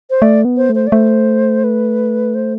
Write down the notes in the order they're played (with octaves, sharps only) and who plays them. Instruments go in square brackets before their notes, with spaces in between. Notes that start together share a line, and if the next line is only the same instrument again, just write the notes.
[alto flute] C5
[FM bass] A3 [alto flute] D5
[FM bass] B3
[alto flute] C5
[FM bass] A3
[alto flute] C5
D5
[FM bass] A3 [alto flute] C5
[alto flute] B4
C5